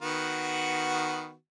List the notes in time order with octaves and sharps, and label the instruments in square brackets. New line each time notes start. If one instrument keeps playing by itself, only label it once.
[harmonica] D#3 B3 F#4